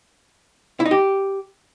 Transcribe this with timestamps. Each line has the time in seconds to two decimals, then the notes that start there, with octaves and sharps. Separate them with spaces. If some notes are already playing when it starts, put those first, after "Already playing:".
0.80 E4
0.86 D#4
0.91 G4